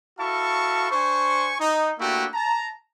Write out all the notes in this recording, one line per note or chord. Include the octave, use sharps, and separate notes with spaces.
E4 F#4 A4 F5 A5 C#6
D4 C5 G#5 C#6
D#4
A3 A#3 D4 E4 F#4 G4
A5 A#5